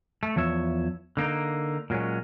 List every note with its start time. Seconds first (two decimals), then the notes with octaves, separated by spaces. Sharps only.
0.23 A3
0.36 E2 F3 C#5 E5
1.17 D3 A#3 D#4
1.90 A#2 F#3 G#3 C#4